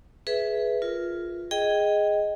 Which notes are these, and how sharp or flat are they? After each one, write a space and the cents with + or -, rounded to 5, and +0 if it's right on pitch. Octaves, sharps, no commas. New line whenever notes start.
G#4 +15 B4 +0 E5 +0
F4 +0 A#4 +0
G#4 +0 D#5 +5 G5 +0